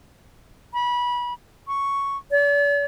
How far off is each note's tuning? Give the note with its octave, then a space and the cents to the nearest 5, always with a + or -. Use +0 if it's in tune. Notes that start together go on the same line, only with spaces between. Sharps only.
B5 -25
C#6 +0
D5 -45